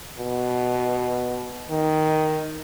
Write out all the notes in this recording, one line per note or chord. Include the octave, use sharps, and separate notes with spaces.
B2
D#3